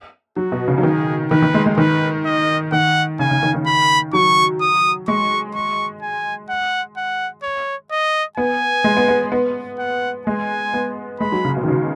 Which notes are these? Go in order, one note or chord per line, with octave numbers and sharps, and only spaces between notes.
F#3 F#4
B2
C#3
F#3
D#3 G#4
D#3 B4
D#3
G#3
G#3
D#3 B4
D#5
D#3 F#5
C#3 G#5
C#3
D#3
D#3
B5
F#3 C#6
D#6
G#3 C#6
C#6
G#5
F#5
F#5
C#5
D#5
B3 G#5
G#3
B3
B3
B3
F#5
G#3 G#5
B3
G#3 B5
F#3
C#3
B2
D#3
C#3